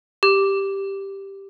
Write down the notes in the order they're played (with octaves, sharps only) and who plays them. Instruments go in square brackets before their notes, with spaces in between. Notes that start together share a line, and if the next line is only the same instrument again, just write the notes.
[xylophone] G4